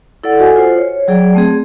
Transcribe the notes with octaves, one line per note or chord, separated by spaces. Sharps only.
E4 A4 D5 F#5
F#4 A4 D#5 F#5 G#5
F4 C5
C#5
F#3 G#4 D5 G5
A3 C4 G#4